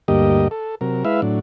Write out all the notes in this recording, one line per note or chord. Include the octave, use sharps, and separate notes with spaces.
D2 G2 A#3 G4 D#5
A4
C3 F#3 A#4
G#3 E4 B4 E5 F5
A2 F#3 D4